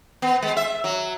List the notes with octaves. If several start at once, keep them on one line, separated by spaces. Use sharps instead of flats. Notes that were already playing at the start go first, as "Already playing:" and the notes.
B3
G#3
E5
F#3